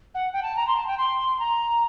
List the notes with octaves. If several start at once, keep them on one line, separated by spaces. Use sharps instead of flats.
F#5
G5
A5
A#5
C6
A5
G5
C6
A#5